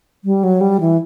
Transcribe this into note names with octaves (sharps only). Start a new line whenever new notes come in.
G3
F#3
G3
E3